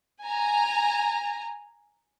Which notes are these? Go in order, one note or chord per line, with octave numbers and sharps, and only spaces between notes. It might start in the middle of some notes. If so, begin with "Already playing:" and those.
G#5 A#5